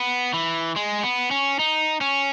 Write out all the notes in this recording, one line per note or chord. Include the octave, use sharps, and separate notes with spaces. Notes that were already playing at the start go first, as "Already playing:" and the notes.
Already playing: B3
E3
G#3
B3
C#4
D#4
C#4